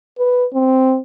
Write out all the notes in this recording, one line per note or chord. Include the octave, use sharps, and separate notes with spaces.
B4
C4